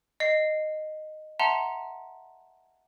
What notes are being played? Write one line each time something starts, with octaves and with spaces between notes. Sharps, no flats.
D#5 C7
E5 F#5 A5 A#5 C6